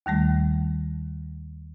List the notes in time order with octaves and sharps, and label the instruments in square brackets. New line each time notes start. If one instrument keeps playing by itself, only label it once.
[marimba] D#2 D#3 G3 A3